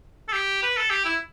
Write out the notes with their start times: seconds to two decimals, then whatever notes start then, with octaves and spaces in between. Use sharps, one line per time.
0.28 A4
0.32 G4
0.63 B4
0.77 A4
0.90 G4
1.05 E4